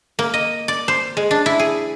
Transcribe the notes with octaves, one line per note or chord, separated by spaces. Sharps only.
A#3
D#5
D5
C5
G#3
D4
E4
G#4